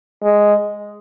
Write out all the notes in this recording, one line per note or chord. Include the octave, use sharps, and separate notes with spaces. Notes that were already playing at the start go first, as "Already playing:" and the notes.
G#3